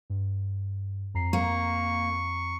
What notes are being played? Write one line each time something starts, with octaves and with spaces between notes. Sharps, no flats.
G2
F2 A#5 C7
A#3 C#6